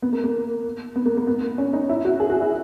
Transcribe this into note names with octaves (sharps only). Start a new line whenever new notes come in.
B3
A#3
A#3
B3
A#3
A#3
B3
C#4
D#4
E4
F#4
G#4
F#4
E4